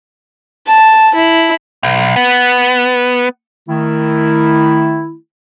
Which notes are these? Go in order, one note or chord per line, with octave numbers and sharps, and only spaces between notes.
A5
E4
B1
B3
D#3 A3 E4